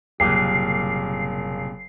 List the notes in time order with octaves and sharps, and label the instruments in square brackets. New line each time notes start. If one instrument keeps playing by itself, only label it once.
[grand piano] F#1 [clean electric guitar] C2 A#2 G4 [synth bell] C7